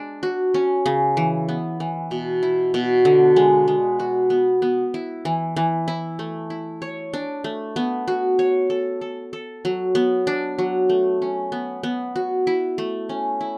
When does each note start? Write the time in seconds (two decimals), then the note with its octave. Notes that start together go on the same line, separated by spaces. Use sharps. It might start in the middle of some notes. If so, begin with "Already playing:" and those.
Already playing: G#3 D4
0.23 F#4
0.54 C#4
0.86 C#3
1.17 E3
1.49 B3
1.80 E3
2.11 B2
2.43 E4
2.74 B2
3.05 D3
3.36 G#3
3.68 G#3
4.00 F#4
4.30 B3
4.62 B3
4.94 E4
5.25 E3
5.57 E3
5.88 E4
6.19 A3
6.50 E4
6.82 C#5
7.14 D4
7.44 A3
7.76 B3
8.08 F#4
8.39 C#5
8.70 A4
9.01 A4
9.33 A4
9.65 F#3
9.95 B3
10.27 D4
10.58 F#3
10.89 A3
11.22 C#4
11.52 B3
11.83 B3
12.16 F#4
12.47 E4
12.78 A3
13.09 C#4
13.41 E4